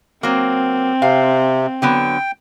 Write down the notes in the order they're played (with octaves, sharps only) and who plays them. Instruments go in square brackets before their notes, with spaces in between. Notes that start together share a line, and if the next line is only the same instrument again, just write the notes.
[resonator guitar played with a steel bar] F#3 A#3 [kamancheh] C4
[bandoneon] C3 [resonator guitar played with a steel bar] F5
[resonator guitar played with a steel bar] D3 F#3 B3 [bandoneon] G5